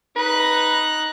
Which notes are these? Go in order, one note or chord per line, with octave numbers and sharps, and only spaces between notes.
D#4 B4 F#6